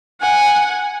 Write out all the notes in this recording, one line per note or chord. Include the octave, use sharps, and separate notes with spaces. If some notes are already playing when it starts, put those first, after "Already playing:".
F#5 G#5